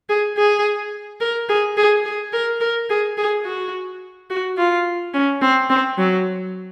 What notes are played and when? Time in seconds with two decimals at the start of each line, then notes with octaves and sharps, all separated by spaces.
0.09 G#4
0.37 G#4
1.21 A#4
1.49 G#4
1.77 G#4
2.06 G#4
2.33 A#4
2.61 A#4
2.90 G#4
3.18 G#4
3.45 F#4
4.30 F#4
4.57 F4
5.14 C#4
5.41 C4
5.70 C4
5.98 F#3